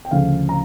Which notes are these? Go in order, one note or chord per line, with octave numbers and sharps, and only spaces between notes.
G5
D2 C#3 F3 A3 F5
A#5